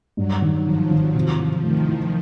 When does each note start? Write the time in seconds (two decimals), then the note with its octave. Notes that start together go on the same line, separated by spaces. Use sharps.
0.17 G2 F#3
0.42 D#3
0.66 G#1 F3
0.91 G#1
1.15 C3
1.39 E3
1.63 D#3 A3
1.89 E3